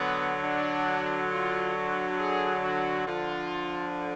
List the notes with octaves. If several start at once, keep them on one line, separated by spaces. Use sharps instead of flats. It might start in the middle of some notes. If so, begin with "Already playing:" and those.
Already playing: D3 F#3 B3
D4
F4
F#4
G#4
F#4
D3 F3 F4